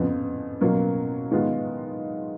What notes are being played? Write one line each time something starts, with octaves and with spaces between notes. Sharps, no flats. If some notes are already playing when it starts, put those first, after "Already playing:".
Already playing: F2 C#3 F3 B3
B2 F#3 A#3 C#4 F4
D#3 G#3 B3 F4